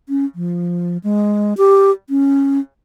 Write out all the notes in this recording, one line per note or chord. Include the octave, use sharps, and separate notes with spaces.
C#4
F3
G#3
G4
C#4